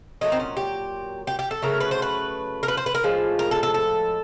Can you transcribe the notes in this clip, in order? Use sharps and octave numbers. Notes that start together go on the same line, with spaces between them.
A#2 F#3 A3 D#4
C4
C#4
G4
G4
G4
A4
C#3 F#3 A3 A#4
B4
C5
B4
A#4
B4
C5
B4
A#4
A2 F3 G#3
A#4
A4
A4
A4